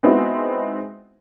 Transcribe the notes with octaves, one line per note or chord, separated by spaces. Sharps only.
G#3 B3 C4 D#4 E4 F#4